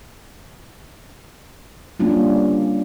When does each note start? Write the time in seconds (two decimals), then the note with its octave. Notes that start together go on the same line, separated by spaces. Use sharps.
2.00 G3 A#3 C#4 D4 F4